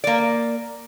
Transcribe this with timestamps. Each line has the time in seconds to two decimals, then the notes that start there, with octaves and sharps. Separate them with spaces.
0.04 A#3 D5